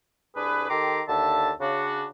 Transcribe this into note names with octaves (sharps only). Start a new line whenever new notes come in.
C2 D4 G#4 B4
D#3 G4 A4 A#5 C6 D6
D#2 D3 E5 A5
C#3 D4 F#4